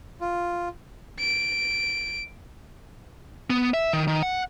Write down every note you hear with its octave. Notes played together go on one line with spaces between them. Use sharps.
F4
D7
B3
E5
D#3
D#3
F#5